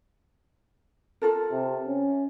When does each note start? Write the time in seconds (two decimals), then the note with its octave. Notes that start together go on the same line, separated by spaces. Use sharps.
1.22 F4 A4 A#4
1.51 C3
1.87 C#4